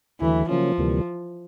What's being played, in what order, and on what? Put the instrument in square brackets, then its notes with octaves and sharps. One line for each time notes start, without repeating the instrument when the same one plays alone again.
[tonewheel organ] D#2 D3 F#3 A3 [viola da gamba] E3
[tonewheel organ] C#3 F#3 A#3 C#4 [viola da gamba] F3
[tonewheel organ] D2 C3 E3 G3 A#3